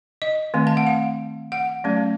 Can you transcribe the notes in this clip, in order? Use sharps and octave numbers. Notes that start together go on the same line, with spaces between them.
D#5
D#3 A3 C4
A5
F#5
F5
F#5
F#3 A3 C#4